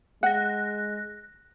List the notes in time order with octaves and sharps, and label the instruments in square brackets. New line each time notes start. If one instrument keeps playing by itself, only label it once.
[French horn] G#3 [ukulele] F#5 [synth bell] F#6 A#6